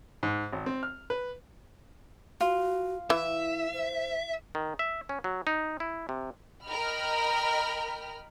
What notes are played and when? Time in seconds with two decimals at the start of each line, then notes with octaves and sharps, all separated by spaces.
0.23 G#2
0.53 G#1
0.66 C4
0.83 F6
1.10 B4
2.41 F4 F#4
3.10 E3 E4 E5
3.73 C5
4.55 D#3
4.79 E5
5.09 C#4
5.24 F#3
5.47 D#4
5.80 E4
6.09 C3
6.65 A#4 D#5 G5 B5 F6